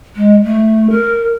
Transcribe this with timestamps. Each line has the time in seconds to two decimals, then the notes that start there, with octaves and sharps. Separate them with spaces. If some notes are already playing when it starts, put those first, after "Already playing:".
0.16 G#3
0.44 A3
0.90 A#4